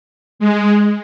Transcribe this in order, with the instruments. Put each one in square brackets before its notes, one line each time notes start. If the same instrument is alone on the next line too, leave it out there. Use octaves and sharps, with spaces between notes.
[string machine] G#3